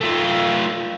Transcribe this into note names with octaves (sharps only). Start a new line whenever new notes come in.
A3 F4